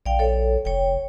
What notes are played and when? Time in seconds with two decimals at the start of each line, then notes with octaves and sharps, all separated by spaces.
0.06 A#1 D5 F5 G5
0.19 A4 C#5
0.65 F1 C#5 G5